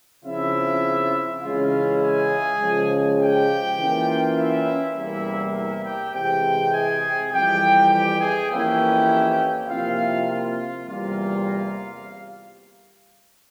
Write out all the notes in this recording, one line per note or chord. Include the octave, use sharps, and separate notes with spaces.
C#3 F3 C4 E4 F4 E5
C#3 E3 G#3 C#4 E4 F4 F5
G#4 G#5
C#3 F3 G#3
G4 G5
E3 A#3 C#4 F4
E4 E5
E2 C3 G3 A#3 E4 E5
E4 E5
G4 G5
C3 E3 G#3 G4 G5
G#4 G#5
F2 E3 G3 G4 G5
G4 G5
G#4 G#5
F2 E3 A#3 C#4 E4 G4 G5
C3 F3 A#3 E4 F4 F5
F4 F5
E2 C3 G3 A#3 F4